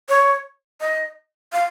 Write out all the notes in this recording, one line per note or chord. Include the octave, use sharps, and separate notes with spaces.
C#5
D#5
F5